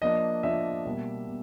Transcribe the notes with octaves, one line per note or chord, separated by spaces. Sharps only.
F3 A#3 D4 D#5
F3 A#3 D4 E5
B2 G3 A#3
B2